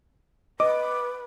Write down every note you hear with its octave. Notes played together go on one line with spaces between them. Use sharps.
B4 D#5 D6